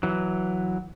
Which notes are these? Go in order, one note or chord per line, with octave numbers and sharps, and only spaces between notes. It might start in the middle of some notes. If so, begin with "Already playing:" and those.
E3 F#3